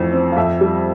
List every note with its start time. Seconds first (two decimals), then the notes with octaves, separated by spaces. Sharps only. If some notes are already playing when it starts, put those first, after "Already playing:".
Already playing: F2 E3 A3
0.13 C4
0.32 F5
0.37 F2 E5
0.61 G3